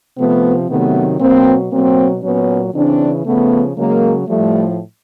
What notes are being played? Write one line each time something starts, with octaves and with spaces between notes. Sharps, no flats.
C3 F3 A3 B3
C3 D#3 F#3 A3 B3
B2 F#3 A#3 C4
B2 F#3 A#3 C4
A#2 F#3 B3 C#4
C#3 E3 C4 D4
C#3 F3 A3 B3
C#3 F#3 G#3 A#3
A2 F3 G3 A3